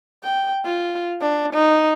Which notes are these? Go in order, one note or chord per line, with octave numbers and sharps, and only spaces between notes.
G5
F4
D4
D#4